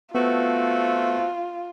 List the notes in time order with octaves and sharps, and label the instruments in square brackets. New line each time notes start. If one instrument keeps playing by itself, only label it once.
[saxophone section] F3 C4 F#4 [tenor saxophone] A3 [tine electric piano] B3 [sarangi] F4